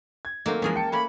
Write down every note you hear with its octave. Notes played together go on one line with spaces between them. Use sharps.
G#6
D#3 F#3 A3 A#3 C4
E3 F3 G#3 C#4 G#4 A#4
G5 A5 C#7
A3 A#3 C#4 B5